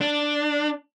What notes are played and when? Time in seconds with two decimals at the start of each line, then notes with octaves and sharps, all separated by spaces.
0.01 D4